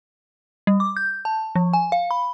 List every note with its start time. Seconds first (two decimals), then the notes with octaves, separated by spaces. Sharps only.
0.67 G3
0.80 D6
0.97 G6
1.25 A5
1.55 F3
1.73 G#5
1.92 F5
2.11 B5